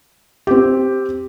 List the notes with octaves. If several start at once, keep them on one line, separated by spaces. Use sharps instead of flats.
C4 G4